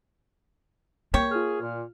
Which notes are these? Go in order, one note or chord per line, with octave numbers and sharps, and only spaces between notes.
A#3 G4 C#5
F4 G#4 F6
A#2